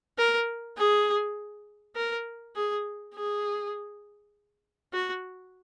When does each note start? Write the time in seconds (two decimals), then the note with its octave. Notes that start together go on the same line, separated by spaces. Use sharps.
0.18 A#4
0.77 G#4
1.96 A#4
2.55 G#4
3.15 G#4
4.93 F#4